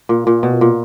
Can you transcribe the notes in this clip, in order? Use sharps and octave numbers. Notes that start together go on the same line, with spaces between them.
A#2
A#2
B2
A#2